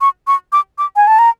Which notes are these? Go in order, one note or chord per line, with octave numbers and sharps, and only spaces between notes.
C#6
C#6
D6
D6
G#5
A5
A#5